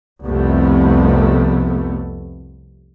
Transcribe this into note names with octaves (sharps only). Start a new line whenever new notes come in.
C2 F2 C3 A3 B3